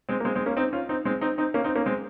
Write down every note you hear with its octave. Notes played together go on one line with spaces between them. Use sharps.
G#3 C4
A#3
G#3 C4
G#3 C4
A#3 C#4
C4 D#4
C#4 F4
C4 D#4
G#3 C4
C4 D#4
C4 D#4
A#3 C#4
C4 D#4
A#3 C#4
G#3 C4